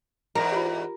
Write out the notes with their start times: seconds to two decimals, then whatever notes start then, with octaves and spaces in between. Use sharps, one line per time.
0.35 E2 G#2 A#4
0.52 F4 G4